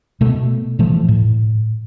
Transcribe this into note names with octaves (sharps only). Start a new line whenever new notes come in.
B2 A3
A#2 E3 F3 A3
A2